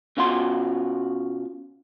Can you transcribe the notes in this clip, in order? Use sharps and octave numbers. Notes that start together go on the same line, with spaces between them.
B2 C#4 F4 F#4 C6